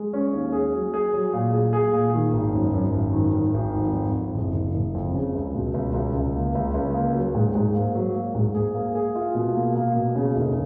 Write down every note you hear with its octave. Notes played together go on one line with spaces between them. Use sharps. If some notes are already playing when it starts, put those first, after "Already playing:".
Already playing: G#3
C#4
D#2
G#4
F#3
G#4
F#3
A#2
G#4
G#4
A#2
D#3
G#1
F#2
F#2
G#1
D#3
D#3
G#1
F2
F2
F2
F#1
F#1
F#1
F2
C#3
C#2
B2
C#2
C#2
C#2
A#3
C#2
C#2
A#3
F#3
G#2
G#2
A#3
F#3
A#3
G#2
G#4
A#3
G#4
F4
B2
A#3
A#3
B2
C#3
F1